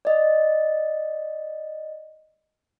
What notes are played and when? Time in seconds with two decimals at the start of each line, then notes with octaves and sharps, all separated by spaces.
0.05 D5 D#5